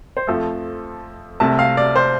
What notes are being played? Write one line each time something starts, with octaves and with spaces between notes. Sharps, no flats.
C5
F2 F3 A3 A4
C2 C3 A3 A5
F5
D5
C5